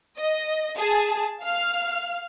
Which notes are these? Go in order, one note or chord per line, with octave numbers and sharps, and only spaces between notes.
D#5
G#4 A5
F5 F6